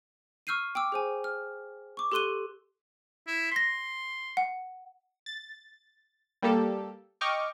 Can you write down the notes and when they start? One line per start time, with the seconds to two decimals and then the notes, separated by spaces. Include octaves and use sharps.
0.47 C#6 E6 F6 G6 C7 D#7
0.75 G5 D6 E6
0.92 G#4 C5 G#5
1.24 F6
1.97 C#6 D6
2.12 G4 A4 C6 F#6 D#7 G7
3.27 E4
3.52 C6 A#6 B6
4.37 F#5
5.26 A6
6.43 G3 A#3 G4 A4
7.21 D#5 G5 C#6 D6 F6